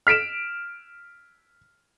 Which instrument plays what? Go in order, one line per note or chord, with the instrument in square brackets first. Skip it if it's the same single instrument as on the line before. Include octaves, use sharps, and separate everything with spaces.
[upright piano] F6 B6 D7 E7